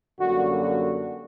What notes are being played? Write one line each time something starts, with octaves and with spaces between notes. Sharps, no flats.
F#2 D3 G3 A#3 F#4
F#4